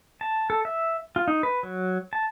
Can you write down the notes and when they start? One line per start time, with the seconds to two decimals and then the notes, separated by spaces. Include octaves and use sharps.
0.21 A5
0.50 A4
0.65 E5
1.16 F4
1.28 D#4
1.43 B4
1.63 F#3
2.13 A5